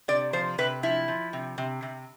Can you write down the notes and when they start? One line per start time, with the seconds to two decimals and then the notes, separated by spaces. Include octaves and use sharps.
0.08 C3 D5
0.33 F3 C5
0.58 C3 B4
0.83 F3 E4
1.08 F3
1.33 C3
1.58 C3
1.83 C3